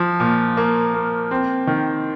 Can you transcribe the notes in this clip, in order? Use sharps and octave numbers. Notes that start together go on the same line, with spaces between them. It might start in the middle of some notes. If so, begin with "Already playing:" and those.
Already playing: F3
A#2
A#3
A#3
C4
D#3